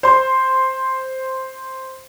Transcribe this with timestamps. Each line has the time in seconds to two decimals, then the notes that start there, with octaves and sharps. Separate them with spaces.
0.03 C5 C6